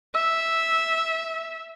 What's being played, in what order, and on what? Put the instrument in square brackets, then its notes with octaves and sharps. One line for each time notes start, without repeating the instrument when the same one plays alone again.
[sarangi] E5 [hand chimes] E6